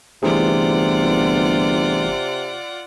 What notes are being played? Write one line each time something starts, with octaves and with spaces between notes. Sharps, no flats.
G1 C3 E3 A3 F4 G#4 D5 F#5